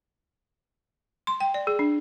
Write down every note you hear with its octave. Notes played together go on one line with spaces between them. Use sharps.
C6
G5
D5
G#4
D4